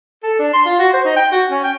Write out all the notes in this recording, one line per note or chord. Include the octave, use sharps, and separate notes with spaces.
A4
D4
C6
F4
F#4
C5
D#4
G5
F#4
C#4
G5